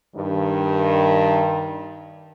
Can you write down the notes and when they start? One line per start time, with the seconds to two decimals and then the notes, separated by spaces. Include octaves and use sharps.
0.16 G2 D#3